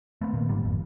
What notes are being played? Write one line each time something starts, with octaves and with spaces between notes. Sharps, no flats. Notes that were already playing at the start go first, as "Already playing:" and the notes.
A3 B3 C4
A#2 D#3 A#3 B3
G#2 D3 D#3 G3
G#1 F2